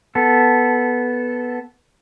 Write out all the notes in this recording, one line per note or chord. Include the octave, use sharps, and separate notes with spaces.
B3 A4